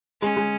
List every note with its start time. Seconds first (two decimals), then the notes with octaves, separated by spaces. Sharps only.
0.22 G#3 C#4
0.37 G#3